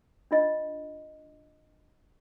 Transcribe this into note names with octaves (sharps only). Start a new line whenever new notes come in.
D4 F4 D#5